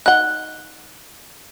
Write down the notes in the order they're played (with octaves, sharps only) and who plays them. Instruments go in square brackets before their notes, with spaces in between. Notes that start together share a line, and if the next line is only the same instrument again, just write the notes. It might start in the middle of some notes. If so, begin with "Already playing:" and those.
[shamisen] D#4 F#5 [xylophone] F#6 G7